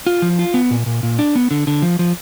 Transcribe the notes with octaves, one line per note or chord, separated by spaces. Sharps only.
F4
F3
F4
B3
A#2
A#2
A#2
D4
B3
D3
D3
F3
F3